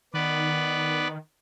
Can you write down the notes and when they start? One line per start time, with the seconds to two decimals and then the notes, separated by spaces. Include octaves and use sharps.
0.14 D#3 B3 B4 D5